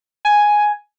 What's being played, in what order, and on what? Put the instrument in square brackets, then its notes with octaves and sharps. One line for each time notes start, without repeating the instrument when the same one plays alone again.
[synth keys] G#5